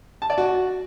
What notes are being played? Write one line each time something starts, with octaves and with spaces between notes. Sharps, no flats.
A5
D5
F#4